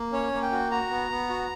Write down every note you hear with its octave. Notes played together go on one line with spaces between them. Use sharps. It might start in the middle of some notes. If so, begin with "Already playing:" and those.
Already playing: A#3
C#4 C#5
A#3
G5
F#4
F#4 A#5
B3
B3
F#4